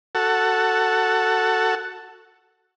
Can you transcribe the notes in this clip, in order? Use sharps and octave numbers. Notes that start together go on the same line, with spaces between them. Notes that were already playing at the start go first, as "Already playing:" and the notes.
F#4 A4